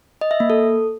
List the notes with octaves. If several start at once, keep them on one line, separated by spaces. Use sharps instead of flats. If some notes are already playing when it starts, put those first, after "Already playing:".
D#5
E5
A#3
A4